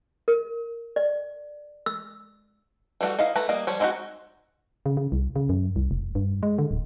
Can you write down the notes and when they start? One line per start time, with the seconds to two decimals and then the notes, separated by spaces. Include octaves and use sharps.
0.28 A#4
0.96 D5
1.86 E6
3.01 E3 G3 A3 F#4
3.19 D#4 E4 D#5 F5
3.35 E3 A3 B4 A#5
3.49 G3 A#3 D#5
3.67 F3 G3 C#5
3.80 G#3 C4 D#4 E4 F#4
4.86 C#3
4.97 C#3
5.12 C2
5.36 C#3
5.49 F#2
5.76 C2
5.91 F1
6.15 G2
6.43 G#3
6.58 D3
6.71 D1